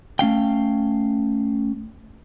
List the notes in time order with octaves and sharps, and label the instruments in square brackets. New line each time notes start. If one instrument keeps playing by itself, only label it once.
[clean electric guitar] A3 C#4 F5 G5